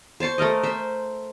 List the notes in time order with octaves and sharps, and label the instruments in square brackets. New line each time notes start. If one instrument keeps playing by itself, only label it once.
[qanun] C5 A5 C6 C#6
A3 A4 A#4 D#5
C5 E5